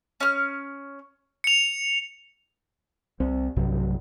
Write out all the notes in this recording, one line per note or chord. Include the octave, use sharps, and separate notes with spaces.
C#4 F6
C#7 F7
C2 C4
B1 G2 C3 F#3